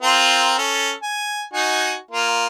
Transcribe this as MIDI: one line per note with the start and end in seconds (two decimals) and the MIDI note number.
0.02 0.56 60
0.02 0.56 65
0.02 0.56 70
0.58 0.92 61
0.58 0.92 69
1.03 1.44 80
1.53 1.96 63
1.53 1.96 66
1.53 1.96 80
2.11 2.47 58
2.11 2.47 65